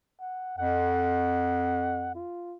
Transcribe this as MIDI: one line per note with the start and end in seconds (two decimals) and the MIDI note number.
0.20 0.54 78
0.58 2.24 41
0.58 2.11 78
2.15 2.57 65